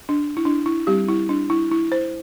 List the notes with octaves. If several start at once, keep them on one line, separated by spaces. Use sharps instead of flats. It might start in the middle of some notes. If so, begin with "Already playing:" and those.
D4
E4
D4
E4
G3 C4 G4
E4
D4
E4
E4
C5